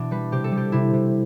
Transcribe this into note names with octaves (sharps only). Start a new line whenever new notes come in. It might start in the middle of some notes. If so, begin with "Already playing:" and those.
Already playing: B2 E3 D4
G3 B4
C3 G4
A4
G3
G4
C3 E4
C3